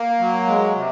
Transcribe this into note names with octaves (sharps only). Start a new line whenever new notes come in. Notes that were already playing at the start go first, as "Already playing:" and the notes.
Already playing: A#3
F#3
G#3
C3